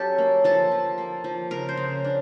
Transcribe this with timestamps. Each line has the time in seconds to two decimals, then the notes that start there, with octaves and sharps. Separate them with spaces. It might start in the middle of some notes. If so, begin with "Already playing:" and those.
Already playing: F#3 C#4 G4 A4
0.18 A#3
0.44 F3 A4
0.72 F3
0.98 A#3
1.24 F3
1.51 C#3 A#4
1.69 C5
1.77 C#3
2.04 D4